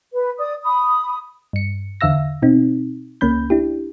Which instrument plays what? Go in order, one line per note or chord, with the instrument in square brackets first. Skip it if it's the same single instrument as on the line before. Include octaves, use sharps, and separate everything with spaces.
[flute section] B4
D5 D#6
B5 D#6
[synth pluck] G2 C#7
E2 D3 E5 F5 E6 A#6
B2 C4 D#4
C#2 A#3 C#4 B5 G6
D4 E4 G4